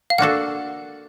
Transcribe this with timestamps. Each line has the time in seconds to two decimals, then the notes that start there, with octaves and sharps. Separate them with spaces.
0.10 F5
0.18 A#3 D4 F#4 A4 F#5